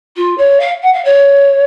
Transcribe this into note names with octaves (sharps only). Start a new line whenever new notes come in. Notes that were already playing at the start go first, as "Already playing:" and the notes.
F4
C#5
F5
F#5
F5
C#5